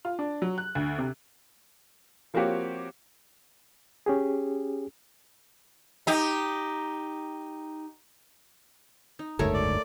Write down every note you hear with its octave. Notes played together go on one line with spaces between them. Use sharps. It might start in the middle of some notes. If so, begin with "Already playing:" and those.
F4
D4
F#3
F#6
D2
C3
F3 A#3 C4 F#4 G4 C#5
C#4 G4 G#4
D#4 G4
D#4
F#1 D2 G#2 A3 A#4 C#5
D5